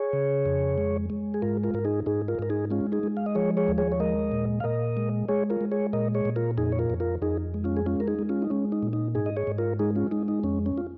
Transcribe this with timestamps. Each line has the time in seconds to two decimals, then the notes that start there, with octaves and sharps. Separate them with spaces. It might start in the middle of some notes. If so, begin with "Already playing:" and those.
Already playing: G#4 C#5
0.13 C#3
0.46 F2
0.78 G#3
1.10 G#3
1.34 G#4
1.42 G#2 F4 A#4
1.64 F4 A#4
1.74 G#2 A#4
1.85 D#4 G#4
2.06 G#2 D#4 G#4
2.28 F4 A#4
2.39 G#2 A#4
2.50 D#4 G#4
2.70 G#3 C#4 F4
2.92 D#4 G#4
3.03 G#3
3.17 F5
3.26 D#5
3.35 F3 G#4 C#5
3.57 G#4 C#5
3.68 D#2
3.78 G#4 C#5
3.92 C#5
4.00 G#3 A#4 D#5
4.32 A#2
4.60 F5
4.64 A#2 A#4 D#5
4.97 G#3
5.28 G#3 G#4 C#5
5.50 F4 A#4
5.61 G#3
5.72 G#4 C#5
5.93 A#2 A#4 D#5
6.15 G#4 C#5
6.25 A#2
6.36 F4 A#4
6.57 F2 D#4 G#4
6.72 C#5
6.79 F4 A#4
6.90 F2
7.00 F4 A#4
7.22 F2 D#4 G#4
7.54 G#3
7.64 C#4 F4
7.77 G#4
7.86 G#3 C#4 F4
8.00 A#4
8.08 D#4 G#4
8.19 G#3
8.29 C#4 F4
8.42 D#4
8.50 G#3 C#4
8.72 D#4
8.83 A#2
8.93 D#4
9.15 G#2 D#4 G#4
9.26 D#5
9.37 G#4 C#5
9.47 G#2
9.58 F4 A#4
9.79 G#3 D#4 G#4
9.95 C#4 F4
10.11 G#3 D#4
10.28 D#4
10.44 F2 C#4
10.66 C#4
10.78 F4